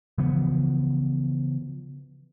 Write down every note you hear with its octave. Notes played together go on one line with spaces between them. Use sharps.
C#3 E3 F3 B3